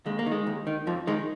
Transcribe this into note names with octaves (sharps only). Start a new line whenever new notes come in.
D#2 G#3
A#3
D#3
G#3
D#2
D#3
F2 F3
D#3 G#3